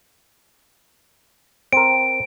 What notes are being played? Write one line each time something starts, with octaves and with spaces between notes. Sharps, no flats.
C4 A#4 D7